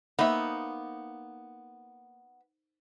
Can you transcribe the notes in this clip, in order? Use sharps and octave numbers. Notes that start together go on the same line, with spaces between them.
A#3 B3 D#4 C5 E5